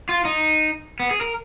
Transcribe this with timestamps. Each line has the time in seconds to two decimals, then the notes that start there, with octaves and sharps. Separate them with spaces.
0.09 F4
0.25 D#4
1.00 B3
1.11 G#4
1.21 A#4